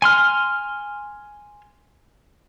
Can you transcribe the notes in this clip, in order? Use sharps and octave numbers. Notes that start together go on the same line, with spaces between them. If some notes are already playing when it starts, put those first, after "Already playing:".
G#5 C6 F6